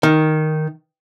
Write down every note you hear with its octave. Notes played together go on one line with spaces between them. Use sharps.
D#3